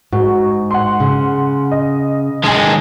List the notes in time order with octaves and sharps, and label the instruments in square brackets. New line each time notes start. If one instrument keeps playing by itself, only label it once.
[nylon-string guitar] G#2 [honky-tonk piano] F#4
[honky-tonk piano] F#5 C6
[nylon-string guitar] C#3
[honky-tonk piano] D#5
[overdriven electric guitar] D#2 G#3 [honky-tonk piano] G#5 A5